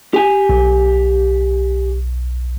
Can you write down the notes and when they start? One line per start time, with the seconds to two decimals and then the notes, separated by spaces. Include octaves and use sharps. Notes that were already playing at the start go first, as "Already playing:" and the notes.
0.14 G4 G#5
0.49 B1